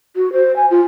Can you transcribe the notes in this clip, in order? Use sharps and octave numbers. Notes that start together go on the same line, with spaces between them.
F#4
C5
G#5
F4